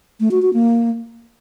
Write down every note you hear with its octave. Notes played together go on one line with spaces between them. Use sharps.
A3
F#4
F#4
A#3